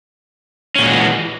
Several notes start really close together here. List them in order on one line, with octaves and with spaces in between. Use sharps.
C#4 A#2 G#3 F#3 E3